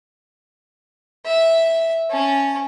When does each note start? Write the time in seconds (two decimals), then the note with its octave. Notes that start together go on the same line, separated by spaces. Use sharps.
1.26 E5
2.10 C#4 A5